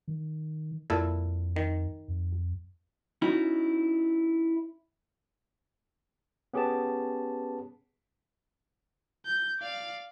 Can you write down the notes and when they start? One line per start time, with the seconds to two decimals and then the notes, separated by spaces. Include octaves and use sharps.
0.08 D#3
0.90 F2 A#2 E4 A4
1.56 D#3
2.08 F2
3.22 C#4 D#4 E4 F#4
6.53 B3 C#4 G4 G#4 B4 A5
9.25 G6
9.59 D5 F5